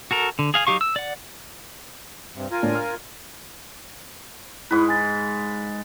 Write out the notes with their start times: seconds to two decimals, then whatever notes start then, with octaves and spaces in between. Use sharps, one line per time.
0.11 F#4 A4 A#4
0.39 D3
0.54 G#4 F5 G#5
0.67 F#3 D#4 G4 F5 C#6
0.81 E6
0.96 D5 F#5
2.35 G2 C3
2.51 F4 A#4 G#5
2.63 A2 D4
2.75 F6
4.71 G#2 E4 B4
4.89 G#5 A6